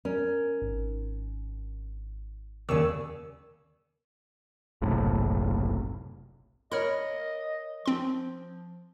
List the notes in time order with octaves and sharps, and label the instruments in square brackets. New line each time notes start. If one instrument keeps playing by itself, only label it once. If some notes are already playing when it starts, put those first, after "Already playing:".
[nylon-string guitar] C#4 [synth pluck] A#4
[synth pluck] G#1
[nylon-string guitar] D#2 C#3 [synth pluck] D5 C#6 E6
[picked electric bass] F#1 B1 A2 C3
[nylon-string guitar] A#4 C#5 [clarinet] D#5 [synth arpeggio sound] B5 F6
[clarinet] F3 [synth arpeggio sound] C4 C6